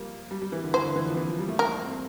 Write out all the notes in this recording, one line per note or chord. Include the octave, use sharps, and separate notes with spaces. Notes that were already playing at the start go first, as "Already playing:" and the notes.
Already playing: F3 G3 A#3
G3
G3
E3
D3
E3 C5
D3
E3
F3
E3
F3
G3
A3
A#3 A#4
C4